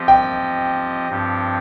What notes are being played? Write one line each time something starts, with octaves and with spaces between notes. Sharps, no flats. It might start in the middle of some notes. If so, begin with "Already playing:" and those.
Already playing: F3 C4 G4 D#5
G5
G2 F3 C4 G4